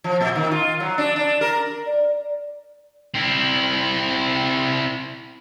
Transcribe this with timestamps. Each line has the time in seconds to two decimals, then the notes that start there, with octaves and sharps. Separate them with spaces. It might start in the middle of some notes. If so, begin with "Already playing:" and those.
0.04 F3
0.21 A#2
0.35 D#3
0.51 F4
0.80 F#3
0.98 D4
1.16 D4
1.41 A#4
1.86 D5
3.15 C4 E4